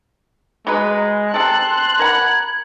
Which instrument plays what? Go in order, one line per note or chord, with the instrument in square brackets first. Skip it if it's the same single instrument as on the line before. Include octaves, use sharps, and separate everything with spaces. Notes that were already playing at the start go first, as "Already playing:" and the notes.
[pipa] F#3 B4 [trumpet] G#3
[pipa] C3 A4 [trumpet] A5 [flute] C6 [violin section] F#6
[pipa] A#4 F#5 B5 [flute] G#6